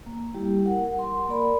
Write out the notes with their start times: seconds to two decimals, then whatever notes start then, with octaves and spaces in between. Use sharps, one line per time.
0.06 A#3
0.34 G3 E4 G4
0.66 A#4 F#5
0.99 C6
1.28 A#3 A#4 D5 B5